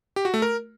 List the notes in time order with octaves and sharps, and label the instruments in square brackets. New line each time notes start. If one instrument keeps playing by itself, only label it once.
[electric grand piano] G4
F#4
A3
A#4